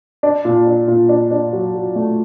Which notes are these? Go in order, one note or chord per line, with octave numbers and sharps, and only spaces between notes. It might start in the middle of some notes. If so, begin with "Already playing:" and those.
D4
A#2
D4
A#2
D4
D4
F#3
F#3
A3